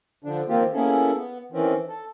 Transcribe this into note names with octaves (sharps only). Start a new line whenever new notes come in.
D3 F3 D4
D#3 F3 A#3 C4 F4 G4
A#3 B3 C#4 E4 G#4 A4
B3
D#3 E3 C4 C#4
A4